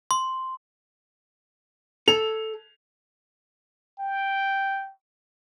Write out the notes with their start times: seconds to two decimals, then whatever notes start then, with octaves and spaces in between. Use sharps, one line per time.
0.11 C6
2.08 A4 F7
3.99 G5